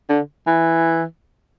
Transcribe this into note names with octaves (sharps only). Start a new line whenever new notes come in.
D3
E3